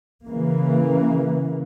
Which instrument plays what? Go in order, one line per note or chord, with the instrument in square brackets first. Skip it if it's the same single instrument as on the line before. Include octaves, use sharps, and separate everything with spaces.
[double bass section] C#3 E3 A#3